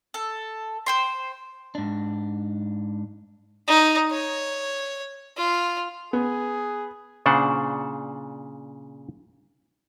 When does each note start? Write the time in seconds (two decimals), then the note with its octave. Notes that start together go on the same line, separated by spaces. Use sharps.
0.14 A4
0.86 C5 G5 C6
1.75 G#2 D4
3.67 D#4
4.11 C#5
5.37 F4
6.13 B3 G#4
7.26 A#2 C#3 D4 C5 F#5